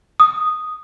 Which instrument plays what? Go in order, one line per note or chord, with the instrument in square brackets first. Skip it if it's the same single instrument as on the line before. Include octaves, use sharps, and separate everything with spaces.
[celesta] D#6